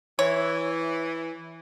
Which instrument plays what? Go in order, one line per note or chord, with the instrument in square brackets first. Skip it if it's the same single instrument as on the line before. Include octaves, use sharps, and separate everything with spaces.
[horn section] E3 [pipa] C#5